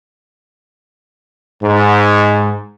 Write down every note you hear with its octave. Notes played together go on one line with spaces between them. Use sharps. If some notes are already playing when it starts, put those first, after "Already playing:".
G#2